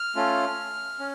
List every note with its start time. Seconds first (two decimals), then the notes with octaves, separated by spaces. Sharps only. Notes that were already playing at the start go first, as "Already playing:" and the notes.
Already playing: F6
0.16 A3 C#4 F4
1.00 C#4